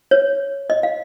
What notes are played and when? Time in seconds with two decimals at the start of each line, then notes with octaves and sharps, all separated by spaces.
0.11 C#5
0.70 D#5
0.83 F5